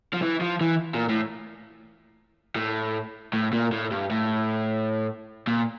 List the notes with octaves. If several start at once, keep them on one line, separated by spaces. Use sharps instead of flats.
F3
E3
F3
E3
A#2
A2
A2
A2
A#2
A2
G2
A2
A#2